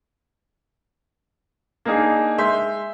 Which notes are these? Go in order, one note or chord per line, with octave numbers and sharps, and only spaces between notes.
A#3 D4 D#4 G#4
G#3 E5 C6 G6